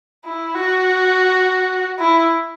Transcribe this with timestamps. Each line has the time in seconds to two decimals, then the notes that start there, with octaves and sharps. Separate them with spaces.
0.25 E4
0.54 F#4
1.99 E4